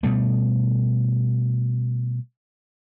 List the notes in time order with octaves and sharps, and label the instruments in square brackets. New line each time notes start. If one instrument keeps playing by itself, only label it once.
[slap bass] B2 G3 A3